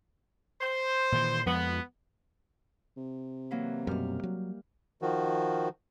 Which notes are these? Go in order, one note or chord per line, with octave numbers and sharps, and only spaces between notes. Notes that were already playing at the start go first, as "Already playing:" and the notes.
C5
A#2 D#3 E3
F2 F3 G#3 B3
C3
E3 F#3 A#3
F#2 B2 G3 F6
F#3
D#3 F3 F#4